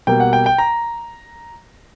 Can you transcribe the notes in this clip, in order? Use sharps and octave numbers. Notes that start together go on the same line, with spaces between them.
B2 G3 A#3 G5
F#5
G5
G5
A#5